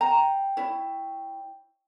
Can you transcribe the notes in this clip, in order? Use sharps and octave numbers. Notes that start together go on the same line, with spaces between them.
G5 A#5
E4 C#5